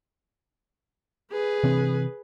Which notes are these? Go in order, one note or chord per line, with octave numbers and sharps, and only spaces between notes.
G#4 B4
C3 E3 C4